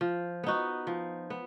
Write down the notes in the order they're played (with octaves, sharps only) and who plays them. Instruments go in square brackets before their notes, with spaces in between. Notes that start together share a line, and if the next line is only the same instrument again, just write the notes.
[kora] F3
B3 D#4 F#4
F3
B3